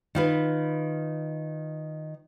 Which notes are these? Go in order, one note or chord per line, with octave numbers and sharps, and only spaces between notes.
D#3 F4 B4